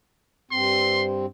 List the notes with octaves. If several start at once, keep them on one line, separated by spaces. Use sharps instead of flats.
G2 C4 C6